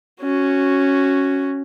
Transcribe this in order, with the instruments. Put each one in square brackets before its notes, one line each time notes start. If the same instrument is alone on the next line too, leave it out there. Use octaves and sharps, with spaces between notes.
[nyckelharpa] C#4 F#4